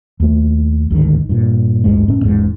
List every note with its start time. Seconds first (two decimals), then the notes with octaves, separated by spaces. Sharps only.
0.20 D#2 A3
0.90 A1 D2 G#2 D#3
1.29 G2 A#2
1.84 G#1 D2 G2 G#3
2.08 A2 B3 C#4
2.25 E1 A1 G#2